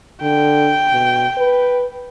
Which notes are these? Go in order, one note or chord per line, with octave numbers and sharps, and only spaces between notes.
D3 G5
B2
B4